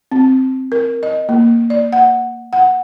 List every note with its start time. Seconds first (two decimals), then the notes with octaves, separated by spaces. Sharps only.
0.12 C4
0.72 A#4
1.03 D#5
1.29 A#3
1.70 D5
1.93 F#5
2.53 F#5